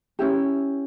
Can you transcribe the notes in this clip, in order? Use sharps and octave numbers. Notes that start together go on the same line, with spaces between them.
C#4 E4 G4